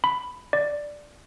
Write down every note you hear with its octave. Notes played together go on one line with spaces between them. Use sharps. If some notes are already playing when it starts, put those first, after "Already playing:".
B5
D5